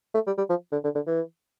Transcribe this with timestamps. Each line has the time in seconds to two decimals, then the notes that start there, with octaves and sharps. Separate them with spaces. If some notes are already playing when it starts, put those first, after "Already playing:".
0.14 A3
0.27 G3
0.38 G3
0.49 F3
0.72 D3
0.84 D3
0.95 D3
1.07 E3